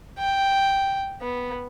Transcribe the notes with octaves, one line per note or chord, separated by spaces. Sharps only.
G5
B3